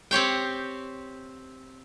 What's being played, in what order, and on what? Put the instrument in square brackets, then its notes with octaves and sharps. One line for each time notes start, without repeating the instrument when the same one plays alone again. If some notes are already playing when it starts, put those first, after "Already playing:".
[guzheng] C4 G4 C#5 G5